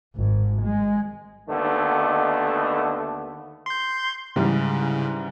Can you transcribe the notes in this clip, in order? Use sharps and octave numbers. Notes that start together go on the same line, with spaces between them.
G#1 G#2
G#3
D#2 D3 D#3 A3 B3
C6 G6
G#2 C#3 E3 G3